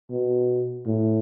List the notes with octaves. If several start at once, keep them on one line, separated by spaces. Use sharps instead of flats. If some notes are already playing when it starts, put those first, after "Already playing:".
B2
A2